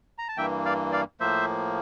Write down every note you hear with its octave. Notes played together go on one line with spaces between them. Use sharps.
A#5
A5
G2 E3 A#3 E5 G5
D5 F5
D5 F5
A2 F3 A#3 C5 E5